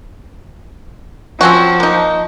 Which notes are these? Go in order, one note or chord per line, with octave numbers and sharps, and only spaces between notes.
F3 C4 C#4 F#4
A#3 D#4